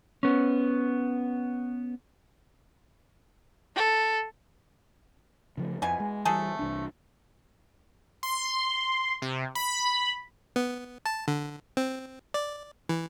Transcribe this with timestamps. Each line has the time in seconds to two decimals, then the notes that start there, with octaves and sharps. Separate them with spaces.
0.23 B3 C#4
3.76 A4
5.57 C#3 F3 A3
5.82 F2 B2 E3 G#5
6.00 G#3
6.25 E3 G3 A3 G#4 A4
6.59 C2 E3 D4
8.23 C6
9.22 C3
9.55 B5
10.56 B3
11.06 A5
11.28 D3
11.77 C4
12.34 D5
12.89 E3